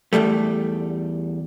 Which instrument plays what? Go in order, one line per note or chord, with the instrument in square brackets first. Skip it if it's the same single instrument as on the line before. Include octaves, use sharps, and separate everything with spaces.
[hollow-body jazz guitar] E2 G#2 G3 A3